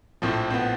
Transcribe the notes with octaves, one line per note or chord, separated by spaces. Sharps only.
A#1 A2 F3 C4
C4
B3